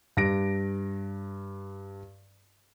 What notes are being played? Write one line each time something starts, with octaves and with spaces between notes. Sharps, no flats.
G2 A#6 D7